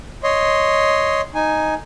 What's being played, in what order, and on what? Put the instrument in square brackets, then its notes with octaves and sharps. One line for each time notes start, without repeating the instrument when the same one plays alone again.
[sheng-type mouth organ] C#5 D#5 C6
D#4 G#5